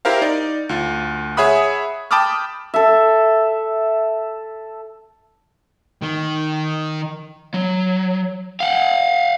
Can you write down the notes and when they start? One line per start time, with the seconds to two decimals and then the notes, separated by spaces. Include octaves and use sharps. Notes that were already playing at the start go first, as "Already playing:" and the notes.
0.05 E4 G4 A#4 C5 F5
0.22 D#4 D5
0.69 D2 F4
1.37 G#4 C#5 E5 F#5 B5 D#6
2.11 G5 A5 B5 D6 D#6 F6
2.74 A4 E5
6.02 D#3
7.54 F#3
8.60 F5 F#5